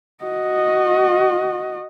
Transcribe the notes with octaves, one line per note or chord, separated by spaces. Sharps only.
F#4 D#5